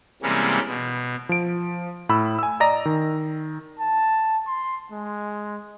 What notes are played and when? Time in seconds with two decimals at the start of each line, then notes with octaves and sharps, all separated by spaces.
0.22 C3 E3 G3 G#3 A#3 C#4
0.68 B2
1.29 F3 D7
2.09 A2 B5 E6
2.39 G#5 E6
2.60 D5 D#5 A#5 A#6
2.86 D#3
3.79 A5
4.47 C6
4.92 G#3